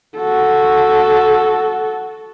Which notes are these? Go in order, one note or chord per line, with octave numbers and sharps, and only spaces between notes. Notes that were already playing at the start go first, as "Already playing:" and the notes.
F#4 A4